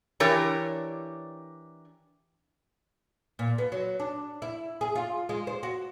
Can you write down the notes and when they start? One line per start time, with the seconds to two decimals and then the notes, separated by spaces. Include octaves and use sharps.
0.20 E3 D4 G4 A#4 C#5
3.39 A#2
3.58 B3
3.72 F#3
4.00 D4
4.42 E4
4.81 G#4
4.95 F4
5.29 G#3
5.47 C5
5.63 F#4